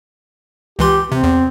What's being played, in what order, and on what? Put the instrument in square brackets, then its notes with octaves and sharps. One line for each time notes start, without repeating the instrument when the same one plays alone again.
[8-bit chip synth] C#2 E3 C6 [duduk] G4
[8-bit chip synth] C3 [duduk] C4
[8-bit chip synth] E2